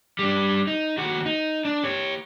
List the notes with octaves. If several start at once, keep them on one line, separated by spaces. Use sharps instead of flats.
G3 D4
D#4
D#2 F#4
D#4
D4
G4 C#5